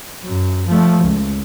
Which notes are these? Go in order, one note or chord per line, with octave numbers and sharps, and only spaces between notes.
F#2
F3 A3
C#2